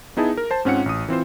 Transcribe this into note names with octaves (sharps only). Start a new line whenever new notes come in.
B3 D#4 E4 G#4 A5
A#4
C5 A5
G#2 C4 C#4 F4 F#5 C#7
A1 D#6
E3 C4 F4 C5